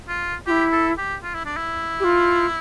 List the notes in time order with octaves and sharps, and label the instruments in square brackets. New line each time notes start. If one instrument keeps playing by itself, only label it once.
[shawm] F4
[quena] F4 [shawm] G4
[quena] E4
[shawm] A4
G4
F4
E4
D4
E4
[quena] G4
F4